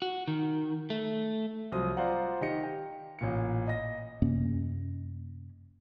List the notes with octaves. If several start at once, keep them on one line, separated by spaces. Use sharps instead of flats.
F#4
D#3
A3
C2 F3 F#3 C5 D#6
F4 C5 D5 F5 F#5 A#5
D#3 G4 D#5 A#6 C#7
G5
A1 A#2 C#7
D#5 A#6
F#2 C3 A#3 C#4